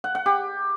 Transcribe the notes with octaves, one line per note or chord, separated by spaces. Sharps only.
F#5
F#5
G4